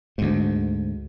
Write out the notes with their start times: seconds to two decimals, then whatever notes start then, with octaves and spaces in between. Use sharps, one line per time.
0.18 D2 G#2